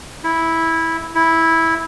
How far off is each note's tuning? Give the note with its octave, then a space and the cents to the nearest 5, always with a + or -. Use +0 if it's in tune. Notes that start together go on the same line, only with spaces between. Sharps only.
E4 -10
E4 -10